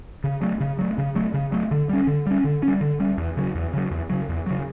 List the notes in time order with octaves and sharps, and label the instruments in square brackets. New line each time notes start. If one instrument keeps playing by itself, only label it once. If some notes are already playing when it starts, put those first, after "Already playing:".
[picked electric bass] C#3
F#3 A3
C#3
F#3 A3
C#3
F#3 A3
C#3
F#3 A3
D3
G3 C#4
D3
G3 C#4
D3
C#4
G3
D3
G3 C#4
E2
C#3 F#3
E2
C#3 F#3
E2
C#3 F#3
E2
C#3 F#3